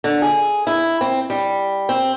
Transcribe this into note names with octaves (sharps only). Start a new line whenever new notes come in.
D3
G#4
E4
C4
G3
C4